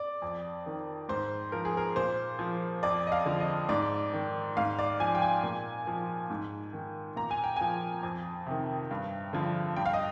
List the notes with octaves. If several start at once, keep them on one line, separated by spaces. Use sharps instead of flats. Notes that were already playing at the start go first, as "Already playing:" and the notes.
Already playing: D5
F2
D#3
G#2 C5
F3 A#4
G#4
A#4
A#2 C5
F3
F2 D5
D#5
F5
D3 F3
D#5
G#2 D5
D#3
G#2 F5
D5
F3 G#5
G5
G#5
A#2
F3
G#2
D#3
A#2 A#5
G#5
G5
F3 G#5
F2
C3 D#3
G2
D3 F3
G2 G5
F5
D#5